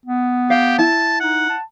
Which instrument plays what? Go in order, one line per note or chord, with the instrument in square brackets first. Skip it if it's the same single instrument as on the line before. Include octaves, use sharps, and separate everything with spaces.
[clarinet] B3
[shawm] G4 [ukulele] F5
[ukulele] E4 [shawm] A5
[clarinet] D#4 [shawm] F#5
[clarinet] A5